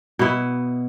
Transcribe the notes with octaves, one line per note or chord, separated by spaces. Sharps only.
B2 B3 E4